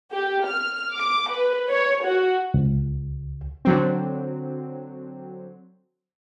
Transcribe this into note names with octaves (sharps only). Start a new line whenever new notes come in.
G4
F6
D6
B4
C#5
F#4
C#2
D3 F#3 C4